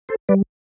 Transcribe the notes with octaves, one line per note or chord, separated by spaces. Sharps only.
A4 C5
G3 B4 D5